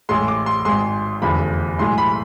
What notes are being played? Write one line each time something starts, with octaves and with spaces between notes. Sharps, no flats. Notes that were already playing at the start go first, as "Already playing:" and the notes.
A1 A2 G#3 C6
D6
C6
G#1 G#2 G#3 C6
F1 E2 D3 F3 A3 B5
B1 A2 E3 G#3 C6
B5